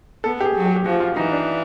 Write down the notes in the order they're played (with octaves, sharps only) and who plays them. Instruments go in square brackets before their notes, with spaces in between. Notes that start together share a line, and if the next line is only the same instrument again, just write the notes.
[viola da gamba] B3 [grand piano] A4
[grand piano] G4
G#4
[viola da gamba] F#3
[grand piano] G4
G4
[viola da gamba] F3 [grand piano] F#4
[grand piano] F4
[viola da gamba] E3 [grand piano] D#4
[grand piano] D4